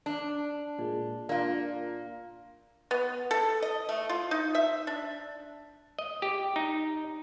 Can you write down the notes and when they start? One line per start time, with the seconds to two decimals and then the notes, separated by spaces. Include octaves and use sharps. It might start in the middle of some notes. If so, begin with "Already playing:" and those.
0.06 D4
0.79 A#2 G#3
1.29 A#2 A#3 D4 F4
2.91 B3
3.31 A4
3.62 D#5
3.89 A3
4.09 F4
4.31 D#4
4.55 E5
4.87 D4
5.99 D#5
6.22 G4
6.56 D#4